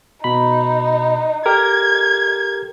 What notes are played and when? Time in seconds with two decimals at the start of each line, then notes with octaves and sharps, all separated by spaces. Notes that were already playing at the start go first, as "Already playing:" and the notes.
0.24 B2 D#4 B5
1.46 G4 A4 A#4 G#6